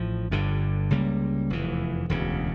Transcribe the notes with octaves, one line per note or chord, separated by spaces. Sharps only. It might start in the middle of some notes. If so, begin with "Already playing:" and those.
Already playing: A1 A2 F3
G1 G2 D3
C#2 C#3 G3 A#3
F1 E2 E3
E1 D2 C#3